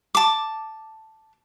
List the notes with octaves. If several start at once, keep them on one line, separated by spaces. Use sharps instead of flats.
A5 D6